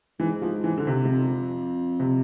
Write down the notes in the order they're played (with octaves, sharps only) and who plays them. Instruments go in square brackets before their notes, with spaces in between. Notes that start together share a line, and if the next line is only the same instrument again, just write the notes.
[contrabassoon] G#2 [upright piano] E3
[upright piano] F3
E3
D3
C3
[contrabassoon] G#2
F2
[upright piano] C3